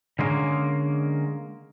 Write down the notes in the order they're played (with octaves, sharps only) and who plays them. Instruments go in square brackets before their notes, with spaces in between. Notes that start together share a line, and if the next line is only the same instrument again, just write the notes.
[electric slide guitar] D3 G#3 A#3 C#4